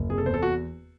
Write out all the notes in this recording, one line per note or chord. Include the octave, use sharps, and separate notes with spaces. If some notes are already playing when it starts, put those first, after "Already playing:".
Already playing: F#1
C3 G#4
A4
E2 C5
A4
F#4